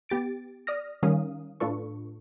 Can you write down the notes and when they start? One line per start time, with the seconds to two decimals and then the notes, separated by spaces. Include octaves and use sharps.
0.09 B3 G4 A6 D7
0.67 D5 D#6 F6 A#6
1.03 D#3 G3 C#4 A#4 F5 D#6
1.60 A2 D4 F4 A4 B4 C#6